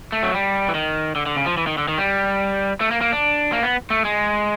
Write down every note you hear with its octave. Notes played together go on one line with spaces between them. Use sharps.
A3
F#3
G3
E3
D#3
D3
D3
C#3
F3
E3
D#3
D3
D#3
G3
A3
A#3
A#3
D4
A#3
B3
A3
G#3